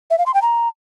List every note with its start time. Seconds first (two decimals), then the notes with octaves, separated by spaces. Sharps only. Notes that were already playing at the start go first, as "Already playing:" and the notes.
0.10 E5
0.18 F5
0.26 C6
0.34 G5
0.42 A#5